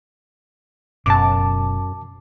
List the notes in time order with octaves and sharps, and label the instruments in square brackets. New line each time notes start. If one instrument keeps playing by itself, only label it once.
[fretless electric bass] F#1 B2 [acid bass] F#2 [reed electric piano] A5 D6